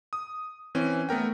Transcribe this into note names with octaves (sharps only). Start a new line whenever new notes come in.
D#6
E3 C4 C#4
A3 B3 A#4 G5